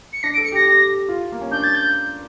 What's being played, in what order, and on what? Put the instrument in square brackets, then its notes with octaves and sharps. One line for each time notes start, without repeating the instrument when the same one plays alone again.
[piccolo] C#7
[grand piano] D4 [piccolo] A#6
[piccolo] D7
[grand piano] A4
[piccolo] C#7
[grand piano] G4
[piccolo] A#6
[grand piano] G4
F4
A#3
C#4
[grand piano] D4 [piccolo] G6
[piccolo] A6
G6